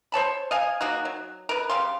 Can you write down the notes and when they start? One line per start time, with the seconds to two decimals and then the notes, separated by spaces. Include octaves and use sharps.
0.12 C5 C#5 A5 B5
0.51 D#5 F5 G#5
0.81 F#3 A#3 D#4 F#4
1.05 F#3
1.49 A#4 B4
1.70 C#3 G3 F5 C6